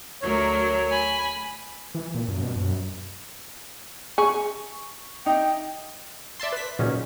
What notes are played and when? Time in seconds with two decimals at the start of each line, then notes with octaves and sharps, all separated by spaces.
0.22 D2 F#3 A#4 C#5
0.90 G#5 B5
1.95 E3
2.15 A#2
2.28 F#2
2.42 B2
2.56 F#2
4.18 G#4 C#6
5.26 D#4 G5
6.40 D5 E5 A5 C6
6.52 B4 B6
6.79 A#2 C#3 F#3 C#4 D#4